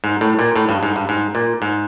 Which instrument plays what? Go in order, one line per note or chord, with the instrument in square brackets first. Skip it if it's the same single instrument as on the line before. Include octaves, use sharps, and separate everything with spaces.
[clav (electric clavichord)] G#2
A2
A#2
A2
G2
G#2
G2
G#2
A#2
G#2